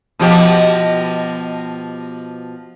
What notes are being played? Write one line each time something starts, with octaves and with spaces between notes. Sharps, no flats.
B2 F3 G4